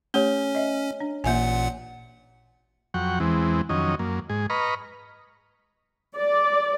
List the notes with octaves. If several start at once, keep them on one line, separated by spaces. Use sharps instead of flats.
A3 C#4 G4 C#5 G7
D#5 E5
D4
A1 A#2 A#3 E5 F#5 G#5
F2 F#3 F#5 G5 C#6
E2 E3 G#3 C4
F2 D#3 F#3 C#4 D#5
F#2 A#3
G#2 G#4
B4 D#5 A#5 B5 C#6 F6
D5